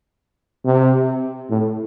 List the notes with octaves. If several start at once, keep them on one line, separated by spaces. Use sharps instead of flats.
C3
A2